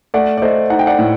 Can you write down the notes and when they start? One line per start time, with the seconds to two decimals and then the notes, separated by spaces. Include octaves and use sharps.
0.14 A3 D5 F#5
0.38 D5
0.42 A3 C5 D#5
0.70 D#4 F#5
0.79 G5
0.87 D5 F#5
0.99 A2